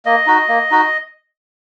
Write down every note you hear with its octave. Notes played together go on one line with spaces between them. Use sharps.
A#3 D#5
D#4 F#4
A#3
D#4 F#4